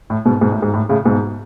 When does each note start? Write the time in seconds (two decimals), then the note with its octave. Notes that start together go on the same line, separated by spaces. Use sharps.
0.10 A2
0.25 G#2 B2
0.41 G#2 B2
0.52 A2
0.62 G#2
0.74 A2
0.89 A2 C#3
1.05 G#2 B2